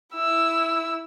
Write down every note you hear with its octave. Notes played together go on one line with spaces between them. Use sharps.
E4 E6